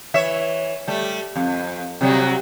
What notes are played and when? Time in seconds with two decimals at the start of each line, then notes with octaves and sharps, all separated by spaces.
0.14 E3 C#5 E5
0.88 G3 A3
1.35 F2
2.01 C3 F#3 G3